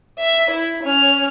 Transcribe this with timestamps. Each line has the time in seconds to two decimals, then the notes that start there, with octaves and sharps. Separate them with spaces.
0.19 E5
0.50 E4
0.83 C#4 F6